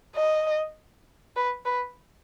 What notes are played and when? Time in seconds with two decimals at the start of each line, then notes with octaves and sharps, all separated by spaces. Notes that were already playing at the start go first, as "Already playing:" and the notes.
0.15 D#5
1.36 B4
1.65 B4